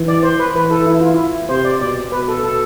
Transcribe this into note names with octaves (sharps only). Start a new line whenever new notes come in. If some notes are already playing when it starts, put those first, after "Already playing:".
Already playing: E3
D5
C5
B4
E3 B4
A4
E4
F4
E4
C3 C5
D5
B2 D5
B2 B4
A4
A4